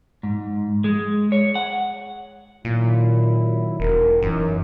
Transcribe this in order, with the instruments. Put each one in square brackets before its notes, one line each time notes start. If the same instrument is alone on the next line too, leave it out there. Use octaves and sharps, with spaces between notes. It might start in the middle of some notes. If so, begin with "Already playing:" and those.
[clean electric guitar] G#2
G#3
C#5
F#5
[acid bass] A#2 [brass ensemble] D#3 F#3 E4
[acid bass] E1 [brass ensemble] A#4
[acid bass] F#2 [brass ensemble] E3 D#4